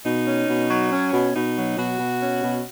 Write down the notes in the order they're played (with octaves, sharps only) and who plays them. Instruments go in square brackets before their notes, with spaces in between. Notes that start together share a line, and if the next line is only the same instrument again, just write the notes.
[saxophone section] B2 D#4
C#4
B2
F#3
C#4
B2
B2 D#4
F#3
B2 F#4
B2
C#4
B2